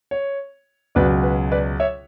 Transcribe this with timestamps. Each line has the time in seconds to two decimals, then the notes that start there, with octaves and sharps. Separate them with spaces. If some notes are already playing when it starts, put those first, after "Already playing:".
0.11 C#5
0.95 C#2 B2 F#3 B4 D5
1.23 B4
1.52 B4 D5
1.80 C#5 E5